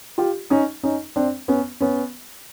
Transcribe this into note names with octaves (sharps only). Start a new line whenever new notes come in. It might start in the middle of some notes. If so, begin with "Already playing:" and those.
F4 G4
C#4 D#4
C#4 D#4
C4 D4
B3 C#4
B3 C#4